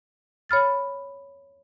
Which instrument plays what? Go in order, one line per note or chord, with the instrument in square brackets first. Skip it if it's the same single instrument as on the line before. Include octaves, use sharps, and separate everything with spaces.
[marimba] C#5 B5 F6 A6